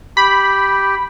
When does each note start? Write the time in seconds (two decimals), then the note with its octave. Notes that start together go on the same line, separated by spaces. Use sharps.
0.17 G4 B5